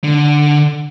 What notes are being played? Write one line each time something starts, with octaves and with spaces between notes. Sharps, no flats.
D3